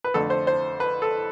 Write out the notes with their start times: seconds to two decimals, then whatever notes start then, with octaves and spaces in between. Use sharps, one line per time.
0.04 B4
0.14 F2 D3 A3 A4
0.30 C5
0.47 C5
0.80 B4
1.02 A4